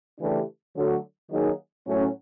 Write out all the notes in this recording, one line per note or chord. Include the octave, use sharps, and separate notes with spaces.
C#3 E3 A3 D4 G4
D3 F#3 A3
D#3 F#3 A#3 D#4 G#4
A2 F#3 A3 C#4